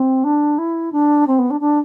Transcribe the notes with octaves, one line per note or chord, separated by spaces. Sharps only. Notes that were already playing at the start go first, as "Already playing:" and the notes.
Already playing: C4
D4
E4
D4
C4
B3
D4
D4